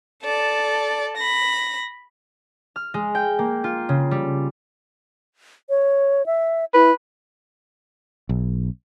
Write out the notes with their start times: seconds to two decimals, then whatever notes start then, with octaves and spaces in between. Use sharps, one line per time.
0.23 A4 D5
1.17 B5 A#6
2.76 F6
2.94 G#3
3.15 G5
3.39 A#3
3.64 F4
3.89 C#3
4.11 G3
5.69 C#5
6.26 E5
6.74 E4 B4
8.29 B1